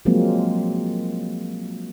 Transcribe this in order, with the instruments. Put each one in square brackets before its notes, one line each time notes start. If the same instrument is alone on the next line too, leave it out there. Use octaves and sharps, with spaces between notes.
[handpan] F3 F#3 G#3 A#3 C4